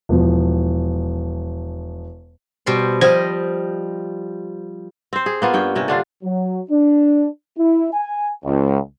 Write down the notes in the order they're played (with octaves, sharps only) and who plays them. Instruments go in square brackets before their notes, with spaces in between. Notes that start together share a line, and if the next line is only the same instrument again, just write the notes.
[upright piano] E1 F3
[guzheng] B2 G3 C5
[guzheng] F3 G3 D#5 [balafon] C5
[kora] C4 C5
G#4
A#3 B3 F4
G2 C#4 G5
C3 C#4
D3 D4 F4
[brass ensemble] F#3
D4
E4
G#5
C#2